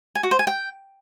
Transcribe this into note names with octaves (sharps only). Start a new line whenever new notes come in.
G#5
F#4
C5
G#5
G5